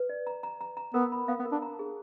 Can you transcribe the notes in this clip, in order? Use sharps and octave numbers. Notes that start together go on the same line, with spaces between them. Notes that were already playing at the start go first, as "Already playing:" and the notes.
Already playing: B4
D5
A#5
A#5
A#5
A#5
B3 A#4
B5
B3 F5
B3
A#4
D4
A#5
G#4